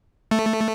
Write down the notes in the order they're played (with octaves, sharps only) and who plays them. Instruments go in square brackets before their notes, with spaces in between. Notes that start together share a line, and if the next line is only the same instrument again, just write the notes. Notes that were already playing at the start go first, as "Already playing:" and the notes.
[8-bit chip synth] A3